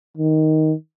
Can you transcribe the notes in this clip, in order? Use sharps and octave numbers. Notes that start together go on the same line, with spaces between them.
D#3